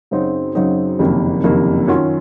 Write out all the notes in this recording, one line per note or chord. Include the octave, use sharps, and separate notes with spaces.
F#2 C#3 F#3 C4 D#4
F#2 C#3 F#3 C4 D#4
F#1 F2 C3 D#3 A#3
F#1 F2 C3 D#3 A#3
F#2 D#3 F#3 C#4 F4